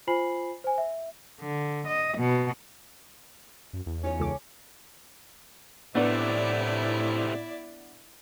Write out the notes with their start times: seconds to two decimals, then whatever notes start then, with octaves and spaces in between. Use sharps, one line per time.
0.07 F4 C5 G#5 B5 C7 F#7
0.64 C5 G#5
0.78 E5
1.41 D3
1.87 D#5
2.18 B2
3.73 F#2
3.86 E2
4.04 C#4 D#4 F4 C#5
4.20 C#2 A4 D6
5.95 A2 C3 A3 B3 D4 E4 D5